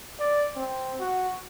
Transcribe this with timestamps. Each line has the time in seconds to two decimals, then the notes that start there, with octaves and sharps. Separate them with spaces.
0.20 D5
0.56 C4
1.00 F#4